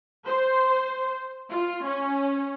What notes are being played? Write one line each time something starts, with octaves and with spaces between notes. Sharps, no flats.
C5
F4
C#4